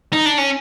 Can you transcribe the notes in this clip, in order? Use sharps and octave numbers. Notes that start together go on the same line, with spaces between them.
D#4
D4
C#4